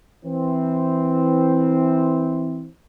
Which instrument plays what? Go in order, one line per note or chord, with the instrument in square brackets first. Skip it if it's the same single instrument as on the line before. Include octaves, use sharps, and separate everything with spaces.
[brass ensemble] E3 C4